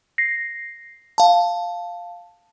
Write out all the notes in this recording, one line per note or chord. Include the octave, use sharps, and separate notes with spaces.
A#6 C7
F5 A5